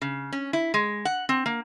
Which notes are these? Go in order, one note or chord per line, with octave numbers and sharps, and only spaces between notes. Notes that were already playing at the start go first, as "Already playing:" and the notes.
C#3
C#4
E4
G#3
F#5
C4
A#3